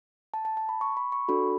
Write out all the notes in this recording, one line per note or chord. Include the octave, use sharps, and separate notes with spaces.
A5
A5
A5
B5
C#6
B5
C#6
D4 F#4 A4 B5